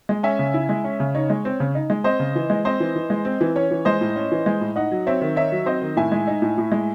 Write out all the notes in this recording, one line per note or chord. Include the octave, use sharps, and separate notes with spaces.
G#3
C#4 E5 G#5
C#3
E4
G#3
C#4
C#3
D#4 C#5
G#3
C4
C#3
D#4
G#3
C4 C5 D#5
C#3
E3
G#3
C4 C5 D#5
E3
E3
G#3
C4
E3
C#4 C#5
E3
G#3 C5 D#5
A2
C#4
E3
G#3
A2
D#4 D#5 F#5
F#3
C4 C#5 E5
D#3
D#4 C#5 E5
F#3
C4 C5 D#5
D#3
A2 E5 G#5
G#3
D#4
A2
A2
G#3